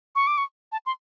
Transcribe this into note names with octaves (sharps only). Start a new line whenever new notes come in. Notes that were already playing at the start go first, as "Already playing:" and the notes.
C#6
D6
C#6
A5
C6